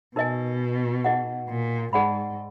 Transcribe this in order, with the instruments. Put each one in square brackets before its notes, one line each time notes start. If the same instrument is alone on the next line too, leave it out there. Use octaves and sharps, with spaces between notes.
[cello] B2 [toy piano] D#4 A#4 D#5 G#5
[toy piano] D#4 G#4 D#5 F#5
[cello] A#2
[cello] G#2 [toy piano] D#4 G#4 D5 F#5 B5